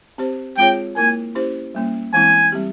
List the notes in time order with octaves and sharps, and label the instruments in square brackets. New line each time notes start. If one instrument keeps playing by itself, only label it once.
[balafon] C4 G4 C5
[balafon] G#3 C4 F4 G#4 C#5 [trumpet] G5
[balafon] A#3 E4 A#4 [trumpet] G#5
[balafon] C#4 E4 G4 C5
G3 A#3 C#4
[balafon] E3 G#3 C4 E4 [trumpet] G#5
[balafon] G3 C4 G4